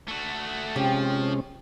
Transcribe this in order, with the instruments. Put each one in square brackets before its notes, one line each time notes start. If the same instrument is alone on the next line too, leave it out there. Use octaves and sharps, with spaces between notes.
[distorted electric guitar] A3 F#4
[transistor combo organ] C3 G#3 C#4 [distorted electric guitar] F3 [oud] G4